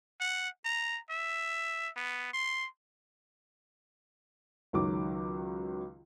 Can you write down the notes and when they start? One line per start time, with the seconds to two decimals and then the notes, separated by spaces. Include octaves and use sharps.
0.20 F#5
0.65 A#5
1.10 E5
1.97 B3
2.33 C6
4.73 C#2 D#3 F#3 D6